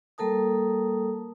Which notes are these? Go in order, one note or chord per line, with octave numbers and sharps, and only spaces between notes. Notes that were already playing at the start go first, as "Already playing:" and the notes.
G3 A#3 A4 A#4 A5 D#6